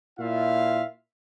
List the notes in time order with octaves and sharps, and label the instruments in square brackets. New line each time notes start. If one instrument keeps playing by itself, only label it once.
[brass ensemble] A#2 E4 F4 E5 F5